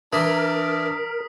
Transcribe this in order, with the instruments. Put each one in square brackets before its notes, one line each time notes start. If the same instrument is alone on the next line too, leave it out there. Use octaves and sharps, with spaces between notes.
[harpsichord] E3 [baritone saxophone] D4 [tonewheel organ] A#4 [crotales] D#6 B6